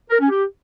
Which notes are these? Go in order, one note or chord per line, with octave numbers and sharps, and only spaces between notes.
A#4
C#4
G4